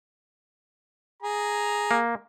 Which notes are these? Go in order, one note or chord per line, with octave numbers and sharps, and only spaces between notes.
G#4 A#5
A#3